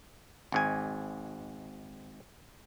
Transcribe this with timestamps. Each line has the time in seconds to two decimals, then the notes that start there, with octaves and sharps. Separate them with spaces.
0.52 G#1 G#2 G#5